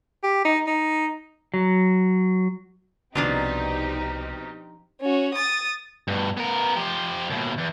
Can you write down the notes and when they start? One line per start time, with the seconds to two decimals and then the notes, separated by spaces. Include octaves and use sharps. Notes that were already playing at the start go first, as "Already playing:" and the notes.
0.23 G4
0.45 D#4
0.67 D#4
1.54 F#3
3.15 C2 B2 F3 C4 D4 D#4 F4 G4
5.01 C#4 F#4
5.35 D#6 A6
6.08 G2 B2
6.37 B3 A#4
6.76 F3 G4
7.30 D#2 B2
7.58 E2